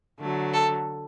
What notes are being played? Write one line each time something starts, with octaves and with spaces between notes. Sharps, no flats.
D3 F#3 A3
A4